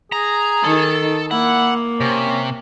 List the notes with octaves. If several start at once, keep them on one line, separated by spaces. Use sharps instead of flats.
G#4 A#5
D#3 D#4 A4
A#3 E4 F#5
C3 C#4